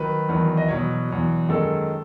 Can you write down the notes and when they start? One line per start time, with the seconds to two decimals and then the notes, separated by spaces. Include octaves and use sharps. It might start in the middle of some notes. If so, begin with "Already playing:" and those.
Already playing: D#3 F#3 B4
0.29 E2 D#3 F#3
0.57 D#5
0.68 E2 B2 F#3 C#5
1.09 E2 B2 F#3
1.49 F#2 D#3 G#3 A4